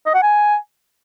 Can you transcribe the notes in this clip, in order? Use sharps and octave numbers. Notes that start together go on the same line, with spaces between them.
D#5
F#5
G#5